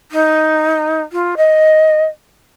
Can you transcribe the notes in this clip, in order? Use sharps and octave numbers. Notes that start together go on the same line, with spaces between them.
D#4
F4
D#5